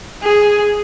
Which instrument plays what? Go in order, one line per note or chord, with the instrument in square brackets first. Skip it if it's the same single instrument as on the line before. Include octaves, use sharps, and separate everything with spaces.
[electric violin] G#4